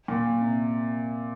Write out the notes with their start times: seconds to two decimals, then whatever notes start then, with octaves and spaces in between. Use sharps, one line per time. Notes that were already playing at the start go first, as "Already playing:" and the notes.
0.08 A#2
0.41 C3